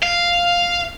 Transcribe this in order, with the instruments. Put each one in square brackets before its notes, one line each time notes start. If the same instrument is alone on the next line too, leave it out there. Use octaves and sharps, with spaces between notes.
[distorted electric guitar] F5